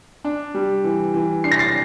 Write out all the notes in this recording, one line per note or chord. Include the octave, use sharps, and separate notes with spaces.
D4
G3
E3
E3
D4 C7
A#6
A6 C7